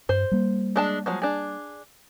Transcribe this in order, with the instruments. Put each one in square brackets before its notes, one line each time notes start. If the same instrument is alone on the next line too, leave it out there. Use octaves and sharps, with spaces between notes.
[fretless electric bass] G2 [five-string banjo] C5
[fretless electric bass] G3 A#3
[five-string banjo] G#3 D4 A5
F3 F#3 G#3
D4 G#4